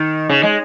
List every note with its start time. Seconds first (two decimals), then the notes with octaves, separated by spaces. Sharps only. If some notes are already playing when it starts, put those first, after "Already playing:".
Already playing: D#3
0.29 C#3
0.43 G#3